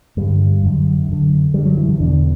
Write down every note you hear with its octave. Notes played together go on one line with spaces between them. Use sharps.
G2 D3 G3
F#2 D3
F#2 D3
F#2 D3 G3
F#3
E3
D3
E2 B2 D3